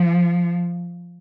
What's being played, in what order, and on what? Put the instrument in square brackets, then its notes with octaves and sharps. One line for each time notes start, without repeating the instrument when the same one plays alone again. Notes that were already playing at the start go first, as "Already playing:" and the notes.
Already playing: [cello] F3